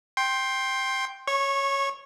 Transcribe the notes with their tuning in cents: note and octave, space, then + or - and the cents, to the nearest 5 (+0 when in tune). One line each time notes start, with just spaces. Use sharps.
G5 +0 C6 +15
C#5 +0 C#6 -20